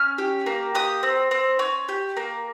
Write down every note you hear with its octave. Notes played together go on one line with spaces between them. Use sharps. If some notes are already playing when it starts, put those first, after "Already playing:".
Already playing: C#4 F6
G4
A#3
G4 D#6
C4
C4
C#4
G4
A#3